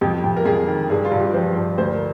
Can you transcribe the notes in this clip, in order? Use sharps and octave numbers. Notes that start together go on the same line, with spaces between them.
F2 G4
F2
A#4
F2 G#4
D#3
G2 G#4
F4
G2
G4
F3 C5
G2
D2 C5
A#4